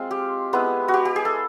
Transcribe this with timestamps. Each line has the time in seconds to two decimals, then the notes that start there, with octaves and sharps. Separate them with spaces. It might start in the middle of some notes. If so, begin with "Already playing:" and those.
Already playing: G#3 C4 F4
0.11 G4
0.53 G#3 B3 E4
0.88 F#4
0.94 G4
1.05 G4
1.16 G#4
1.25 A4